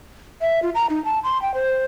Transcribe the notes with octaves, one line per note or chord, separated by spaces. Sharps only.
E5
F4
A#5
D#4
A5
C6
G5
C5